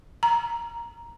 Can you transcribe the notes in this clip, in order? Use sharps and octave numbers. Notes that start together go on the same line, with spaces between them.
A#5